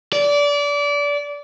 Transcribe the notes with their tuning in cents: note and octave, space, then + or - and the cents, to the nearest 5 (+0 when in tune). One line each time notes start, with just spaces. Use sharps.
D5 -25